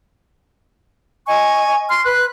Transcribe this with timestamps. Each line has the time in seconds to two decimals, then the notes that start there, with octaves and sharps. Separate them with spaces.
1.27 D#5 G#5 C#6
1.89 C6 F6
2.04 B4 F#6